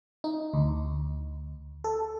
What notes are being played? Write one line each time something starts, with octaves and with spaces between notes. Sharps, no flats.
D#4
D2
A4